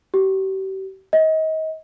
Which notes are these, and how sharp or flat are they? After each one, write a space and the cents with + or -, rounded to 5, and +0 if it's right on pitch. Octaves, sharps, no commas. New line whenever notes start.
G4 -40
D#5 +30